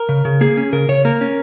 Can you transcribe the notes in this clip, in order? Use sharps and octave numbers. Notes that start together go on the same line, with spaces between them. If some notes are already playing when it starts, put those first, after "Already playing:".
Already playing: A#4
C#3
C#3
A#3 G#4
C#4
C#3 A#4
C#3 C#5
A#3 A#4
C#4